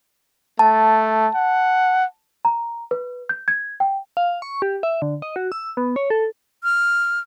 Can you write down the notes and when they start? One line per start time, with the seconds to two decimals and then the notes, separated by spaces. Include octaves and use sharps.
0.59 A3 A5
1.35 F#5
2.45 A#5
2.91 B4
3.29 G6
3.48 G#6
3.80 G5
4.17 F5
4.42 C#6
4.62 G4
4.83 E5
5.02 D3
5.22 D#5
5.36 F#4
5.52 E6
5.77 B3
5.96 C#5
6.10 A4
6.64 F6